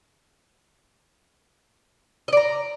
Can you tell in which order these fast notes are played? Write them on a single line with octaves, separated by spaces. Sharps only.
D#5 D5 A#5